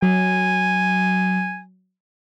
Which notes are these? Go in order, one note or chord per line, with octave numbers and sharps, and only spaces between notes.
F#3 G#5